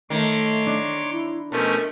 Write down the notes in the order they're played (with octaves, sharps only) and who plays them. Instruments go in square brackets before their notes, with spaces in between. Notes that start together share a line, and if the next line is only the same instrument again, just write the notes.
[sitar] D#3 [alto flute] A3 [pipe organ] C#5 C6 D6
[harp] D4
[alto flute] E4
[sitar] B2 [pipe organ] F3 A3 C#4 [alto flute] A#4